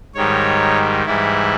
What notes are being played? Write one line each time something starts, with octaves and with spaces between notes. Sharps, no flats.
G#2 D#3 G3 C#5
G#2 E3 G3 E4